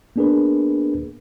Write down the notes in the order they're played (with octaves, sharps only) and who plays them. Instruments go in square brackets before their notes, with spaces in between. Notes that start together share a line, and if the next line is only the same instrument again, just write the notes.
[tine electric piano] A#3 B3 D4 G#4 A#4 B4